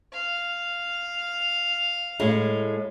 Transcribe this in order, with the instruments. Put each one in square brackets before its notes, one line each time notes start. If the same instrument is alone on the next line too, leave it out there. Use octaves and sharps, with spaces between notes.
[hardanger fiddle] F5
[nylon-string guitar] A2 G#3